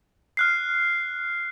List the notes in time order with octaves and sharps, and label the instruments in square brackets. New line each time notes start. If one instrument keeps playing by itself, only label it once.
[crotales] F6 F#6 C7